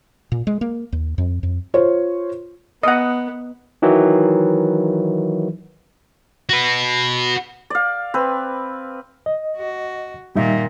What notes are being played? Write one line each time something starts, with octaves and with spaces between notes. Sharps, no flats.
A#2
G#3
A#3
D#2
F2
F2
F4 C5 C#5
B3 D#5 F#5
D#3 E3 F#3
F#4 B4
D5 F5
C4 B4
D#5
F#4
A#2 D#3 G3 D#4 E5